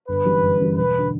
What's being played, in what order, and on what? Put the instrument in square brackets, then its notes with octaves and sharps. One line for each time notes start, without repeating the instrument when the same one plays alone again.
[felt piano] G1 [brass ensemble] B4
[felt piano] F#2 E3 G3
G1
F#2 E3 G3
[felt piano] E1 [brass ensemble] B4
[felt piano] D3